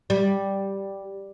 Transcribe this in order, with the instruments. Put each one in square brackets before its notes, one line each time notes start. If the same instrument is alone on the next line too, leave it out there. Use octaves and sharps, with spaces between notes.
[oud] G3